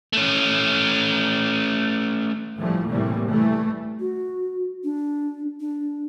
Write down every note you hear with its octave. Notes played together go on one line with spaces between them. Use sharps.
A3 C#4
A2 E3 F3 G3 A3
A2 C3 E3 G3 A3 A#3
E3 G3 A3
F#4
D4
D4